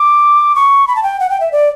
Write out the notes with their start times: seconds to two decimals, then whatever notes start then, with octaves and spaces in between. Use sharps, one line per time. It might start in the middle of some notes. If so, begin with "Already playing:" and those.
Already playing: D6
0.55 C#6
0.88 B5
0.96 A5
1.03 G5
1.20 F#5
1.30 G5
1.40 E5
1.52 D5